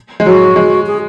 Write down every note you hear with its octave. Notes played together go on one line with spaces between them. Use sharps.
G#3
F#3 F#4
G#3
G#4